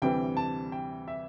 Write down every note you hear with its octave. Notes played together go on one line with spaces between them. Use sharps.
D2 C3 E3 G3 C4 G5
A5
G5
E5